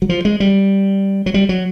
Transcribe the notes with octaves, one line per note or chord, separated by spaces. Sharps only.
F#3
F3
G#3
G3
F#3
G3
F#3